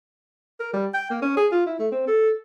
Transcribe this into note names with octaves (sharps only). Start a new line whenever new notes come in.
A#4
G3
G5
A#3
C#4
G#4
F4
E4
A3
C4
A4